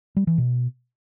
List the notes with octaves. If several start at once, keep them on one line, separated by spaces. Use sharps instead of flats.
G3
E3
B2